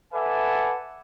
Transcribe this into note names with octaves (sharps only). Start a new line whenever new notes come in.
A4 B4 D5 E5 F#5 G#5